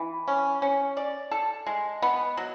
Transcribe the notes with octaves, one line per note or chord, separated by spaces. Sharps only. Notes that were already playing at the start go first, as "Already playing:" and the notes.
Already playing: E3
C#4
C#4
D5
A4
G#3
B3
F#3